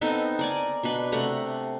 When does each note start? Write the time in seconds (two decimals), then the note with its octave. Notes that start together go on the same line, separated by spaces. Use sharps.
0.01 B3 C4 D#4 A4
0.39 A#4 D5 G#5
0.83 B2 D4 B4
1.12 C3 A3 F#5 A#5